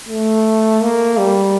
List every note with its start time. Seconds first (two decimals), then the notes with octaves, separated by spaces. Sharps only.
0.09 A3
0.83 A#3
1.18 G3